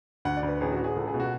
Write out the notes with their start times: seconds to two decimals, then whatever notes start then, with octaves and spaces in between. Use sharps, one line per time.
0.25 D2 F#5
0.37 D5
0.43 D2
0.49 B4
0.61 A1 G#4
0.72 F#4
0.78 A1
0.84 G#4
0.96 C#2 A4
1.08 G#4
1.14 B2
1.20 F#4